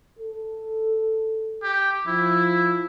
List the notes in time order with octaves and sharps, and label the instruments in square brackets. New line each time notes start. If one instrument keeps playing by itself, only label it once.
[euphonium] A4
[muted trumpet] G4
[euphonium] F3 [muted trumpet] E4